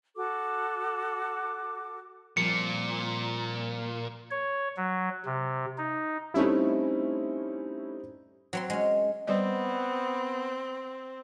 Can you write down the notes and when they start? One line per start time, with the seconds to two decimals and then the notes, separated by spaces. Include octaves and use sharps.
0.16 F#4 A4 D6
2.37 A#2 F3 G3 C4 C#7
4.31 C#5
4.77 F#3
5.25 C3
5.78 D#4
6.34 G3 A3 C4 C#4 D#4 E4
8.53 F#3 C4 C6
8.70 G#3 C#4
9.28 G3 B3 C4 D#5